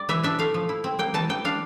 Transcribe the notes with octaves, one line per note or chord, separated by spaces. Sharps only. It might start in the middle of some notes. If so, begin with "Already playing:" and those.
Already playing: G3 D5
E3 E5
D4 E5
A3 F5
F3
E4
C4
A#3 G5
E3 A5
E3 G5
D4 F5